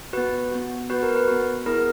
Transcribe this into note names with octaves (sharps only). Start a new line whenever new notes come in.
B3 F#4 B4
B3 F#4
B3 F#4 B4
A#4
B4
B3 F#4
B3 E4 G#4 A#4